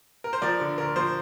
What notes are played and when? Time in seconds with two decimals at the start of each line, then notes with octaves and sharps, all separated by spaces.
0.24 A#4
0.33 C5
0.42 F3 A#4 D5
0.60 D3
0.78 D2 A#4
0.96 F3 C5